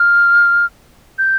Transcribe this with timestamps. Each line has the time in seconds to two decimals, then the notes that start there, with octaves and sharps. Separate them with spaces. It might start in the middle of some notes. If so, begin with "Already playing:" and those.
Already playing: F6
1.18 G6